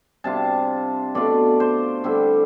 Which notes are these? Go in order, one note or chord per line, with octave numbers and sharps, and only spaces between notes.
C3 G3 D4 F4 A5
B2 A3 D4 F4 D5
C5
D3 G3 C4 E4